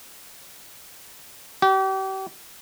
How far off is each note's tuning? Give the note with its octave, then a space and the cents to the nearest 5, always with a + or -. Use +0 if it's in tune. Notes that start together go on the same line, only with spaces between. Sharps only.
G4 -35